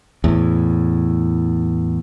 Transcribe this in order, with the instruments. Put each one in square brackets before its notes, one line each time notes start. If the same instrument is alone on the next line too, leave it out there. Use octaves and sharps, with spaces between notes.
[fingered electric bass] E2 A2